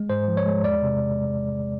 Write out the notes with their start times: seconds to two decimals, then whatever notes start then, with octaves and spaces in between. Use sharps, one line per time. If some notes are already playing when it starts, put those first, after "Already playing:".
Already playing: G#3
0.10 G#2 C5
0.28 F3
0.37 C#5
0.46 G#3
0.63 E2 D5
0.83 C3